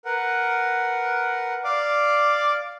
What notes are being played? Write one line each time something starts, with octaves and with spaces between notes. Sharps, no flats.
A#4 B4 F#5
D5 F5 D6